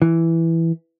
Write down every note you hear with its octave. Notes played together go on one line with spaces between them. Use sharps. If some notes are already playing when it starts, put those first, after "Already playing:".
E3